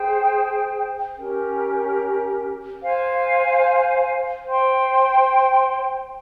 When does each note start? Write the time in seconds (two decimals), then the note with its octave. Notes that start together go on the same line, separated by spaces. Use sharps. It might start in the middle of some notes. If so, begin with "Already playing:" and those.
Already playing: G#4 C5 G5
1.18 C#4 G4 A#4
2.82 C5 F5 G#5
4.45 C5 G5 C6